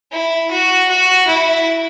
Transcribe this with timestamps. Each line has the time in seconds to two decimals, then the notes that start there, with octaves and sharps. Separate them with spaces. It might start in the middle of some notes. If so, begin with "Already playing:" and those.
0.12 E4
0.51 F#4
0.88 F#4
1.27 E4